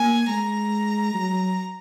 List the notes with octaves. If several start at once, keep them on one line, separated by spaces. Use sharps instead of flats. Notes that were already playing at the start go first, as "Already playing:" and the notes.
Already playing: A#3 G#5
G#3 A#5
F#3